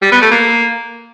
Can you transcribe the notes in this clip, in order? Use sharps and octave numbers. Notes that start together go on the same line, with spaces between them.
G3
B3
A3
A#3